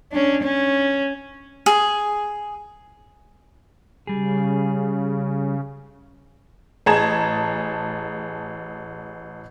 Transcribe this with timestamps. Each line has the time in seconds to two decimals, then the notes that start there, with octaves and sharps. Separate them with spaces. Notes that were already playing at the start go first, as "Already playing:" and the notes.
0.12 C#4 D4
0.42 C#4
1.66 G#4
4.07 C#3 G3 G#4
6.86 A1 G#4 A5 A#5 G#6 E7